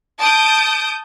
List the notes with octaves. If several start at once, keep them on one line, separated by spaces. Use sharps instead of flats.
A5 D#6 G6 D7